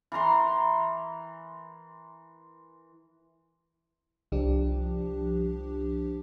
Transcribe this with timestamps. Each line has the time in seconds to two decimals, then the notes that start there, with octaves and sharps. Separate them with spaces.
0.12 E3 A#4 A#5 C6
4.32 C2 F3 D4 G4